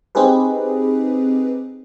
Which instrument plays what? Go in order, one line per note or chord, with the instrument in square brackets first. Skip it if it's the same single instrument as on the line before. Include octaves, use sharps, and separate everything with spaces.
[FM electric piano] C4 D#4 G4 G#4 B4